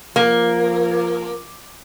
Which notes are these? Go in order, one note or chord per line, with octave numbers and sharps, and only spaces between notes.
F3 A#3